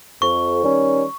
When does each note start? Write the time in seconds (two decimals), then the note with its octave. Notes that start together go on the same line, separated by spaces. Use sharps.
0.22 F2 C#6
0.62 D#3 G3 C#4